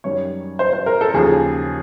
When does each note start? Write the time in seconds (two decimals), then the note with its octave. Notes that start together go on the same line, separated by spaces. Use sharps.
0.04 F#2 D#3 G3 C#5
0.59 C5
0.73 C5
0.86 A#4
1.01 A4
1.14 D#2 C#3 F3 G#4